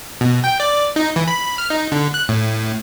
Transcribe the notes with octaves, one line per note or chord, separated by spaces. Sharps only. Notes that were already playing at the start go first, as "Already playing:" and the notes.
B2
G5
D5
D#4
E3
B5
F6
D#4
D3
F#6
A2